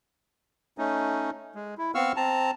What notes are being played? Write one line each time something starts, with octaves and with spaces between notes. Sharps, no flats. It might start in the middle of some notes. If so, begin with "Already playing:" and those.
A3 C#4 D#4
G#3
E4
B3 C4 F5 C#6 E6 F6
C4 A5 A#5